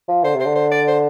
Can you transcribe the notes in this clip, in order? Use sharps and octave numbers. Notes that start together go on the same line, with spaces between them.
F3
D3 C5
C3
C5
D3
C5
D5
C5